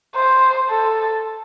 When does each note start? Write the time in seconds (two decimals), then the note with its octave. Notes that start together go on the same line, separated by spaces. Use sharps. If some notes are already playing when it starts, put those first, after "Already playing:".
0.16 C5
0.70 A4